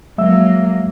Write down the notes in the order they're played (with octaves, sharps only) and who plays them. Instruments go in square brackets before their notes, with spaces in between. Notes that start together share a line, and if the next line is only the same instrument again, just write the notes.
[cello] F#3 A#3 [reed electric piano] G#3 E5 E6